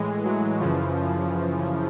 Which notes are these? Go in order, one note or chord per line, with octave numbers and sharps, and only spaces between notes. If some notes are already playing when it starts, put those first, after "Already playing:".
Already playing: A2 E3 G#3
F#3
F#2 C#3 E3 F3